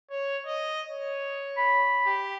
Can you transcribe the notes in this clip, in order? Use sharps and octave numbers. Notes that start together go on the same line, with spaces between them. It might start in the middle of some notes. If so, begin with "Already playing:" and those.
C#5
D#5
C#5
B5
G4